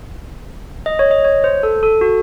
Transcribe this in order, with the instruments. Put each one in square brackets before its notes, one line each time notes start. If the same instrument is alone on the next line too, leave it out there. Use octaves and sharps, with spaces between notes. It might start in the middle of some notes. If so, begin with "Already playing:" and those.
[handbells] D#5
C#5
D#5
C#5
C5
A4
A4
F#4